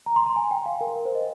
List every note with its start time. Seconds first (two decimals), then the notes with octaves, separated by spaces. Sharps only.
0.06 A#5
0.16 C6
0.26 A#5
0.36 G#5
0.51 G5
0.66 F5
0.81 A#4
0.96 A#4
1.05 C5
1.15 D#5